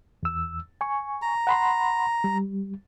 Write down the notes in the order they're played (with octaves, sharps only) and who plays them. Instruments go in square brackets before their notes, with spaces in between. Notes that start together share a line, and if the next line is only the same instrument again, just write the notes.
[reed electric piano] E2 E6
G#5 C#6
[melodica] A#5
[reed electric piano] F#5 B5 C6
G3